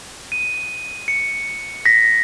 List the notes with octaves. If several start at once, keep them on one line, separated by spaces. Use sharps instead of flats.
D#7
C#7
A#6 B6